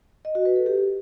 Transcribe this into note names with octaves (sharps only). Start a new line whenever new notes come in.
D#5
F#4
B4
A4
G4